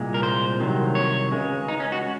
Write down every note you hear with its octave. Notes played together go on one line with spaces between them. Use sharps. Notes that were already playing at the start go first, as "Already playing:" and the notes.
Already playing: C2 A#2 G#3
A#4
C5
C2 C3 D#3 F#3
C#5
C#2 C#3 G#3
D#4
C#4
F#4